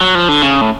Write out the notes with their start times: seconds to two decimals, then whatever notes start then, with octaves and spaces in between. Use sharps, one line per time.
0.01 F#3
0.15 F3
0.29 D3
0.42 C#3
0.61 A2